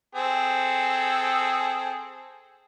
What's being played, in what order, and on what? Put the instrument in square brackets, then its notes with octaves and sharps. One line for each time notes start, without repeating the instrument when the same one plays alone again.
[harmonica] C4 G#4 A4